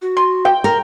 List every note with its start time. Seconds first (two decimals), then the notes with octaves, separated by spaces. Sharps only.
0.02 F#4
0.17 C6
0.45 G5
0.64 A#4